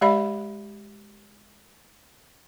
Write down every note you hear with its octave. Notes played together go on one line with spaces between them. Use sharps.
G#3 G4 D5 E5 B5